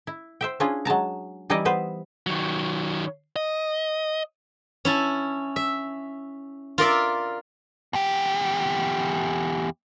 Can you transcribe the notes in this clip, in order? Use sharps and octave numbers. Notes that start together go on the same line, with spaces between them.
E4
C5 E5 G5
C#4 D4 E4 F4 G#4
F#3 G#3 A5 A#5
E3 G3 D#4 E4 D5 D#5
B3 B4 C5
D#3 F#3
D#5
C#4 E4 A5
E5
F4 A#4 D5 E5
E2 G4